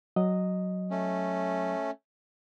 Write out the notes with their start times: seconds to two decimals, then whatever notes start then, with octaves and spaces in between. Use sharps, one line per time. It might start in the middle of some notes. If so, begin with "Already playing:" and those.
0.16 F#3 D#5
0.91 A3 C#4